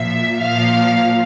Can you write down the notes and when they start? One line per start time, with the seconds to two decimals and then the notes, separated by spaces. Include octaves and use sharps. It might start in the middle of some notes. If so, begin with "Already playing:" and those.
Already playing: A#2 F3 E5
0.42 A#2 F3 F5